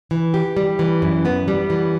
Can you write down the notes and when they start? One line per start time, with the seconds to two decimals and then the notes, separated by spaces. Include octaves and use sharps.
0.11 E3
0.34 G4
0.57 G3
0.79 E3
1.02 F#2
1.25 B3
1.48 G3
1.70 E3